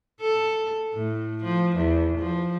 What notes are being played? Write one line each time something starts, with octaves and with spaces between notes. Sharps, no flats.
A4
A2
F3
E2
F3